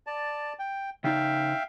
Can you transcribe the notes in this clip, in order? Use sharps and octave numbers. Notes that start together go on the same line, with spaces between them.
D5 A5
G5
C#3 D#4 E5 F5 G5